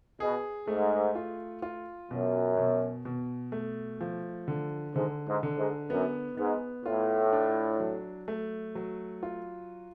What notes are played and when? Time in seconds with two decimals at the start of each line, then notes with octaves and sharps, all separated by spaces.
0.20 B2 G#4
0.67 G#2 A3
1.15 F4
1.62 F4
2.11 F#2 B2
2.57 B2
3.05 B2
3.52 A3
4.01 F3
4.48 D3
4.95 G#2 D3
5.27 G#2
5.43 D3
5.58 G#2
5.90 F#2 B3
6.37 G#2 B3
6.85 A2 F4
7.33 D4
7.80 F#3
8.28 A3
8.75 F#3
9.23 F4